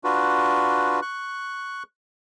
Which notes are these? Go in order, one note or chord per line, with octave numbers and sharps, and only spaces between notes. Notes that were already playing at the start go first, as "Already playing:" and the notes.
D4 F4 F#4 B4
C#6 F#6